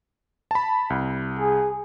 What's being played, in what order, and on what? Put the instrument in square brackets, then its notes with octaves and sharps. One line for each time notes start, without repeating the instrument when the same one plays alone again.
[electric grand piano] A5 B5
C2
[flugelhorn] G#4